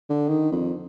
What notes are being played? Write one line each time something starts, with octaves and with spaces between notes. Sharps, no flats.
D3
D#3
F2